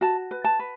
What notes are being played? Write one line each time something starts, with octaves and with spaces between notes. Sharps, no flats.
F#4 A5
B4
A5
B4